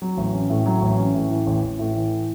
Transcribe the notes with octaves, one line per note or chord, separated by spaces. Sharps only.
F#3
A1
C#4
A2
F#3
A1
C#4
A2
E3
A1
A1
A2
E3